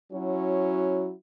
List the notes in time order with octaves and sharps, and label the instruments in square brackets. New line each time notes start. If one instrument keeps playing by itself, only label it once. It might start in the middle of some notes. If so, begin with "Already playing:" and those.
[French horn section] F#3 C#4 E4 F#4